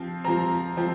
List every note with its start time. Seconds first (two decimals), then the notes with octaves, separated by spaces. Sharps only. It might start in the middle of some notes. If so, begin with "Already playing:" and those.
Already playing: F3 C4
0.24 F3 C4 A#5
0.77 F3 C4